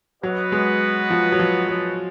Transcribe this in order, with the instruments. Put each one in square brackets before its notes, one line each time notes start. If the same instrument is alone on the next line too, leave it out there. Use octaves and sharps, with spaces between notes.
[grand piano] F#3 [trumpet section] B3 F#4 B4 D#5 F#5
[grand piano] G#3
F3
F#3
F3
F#3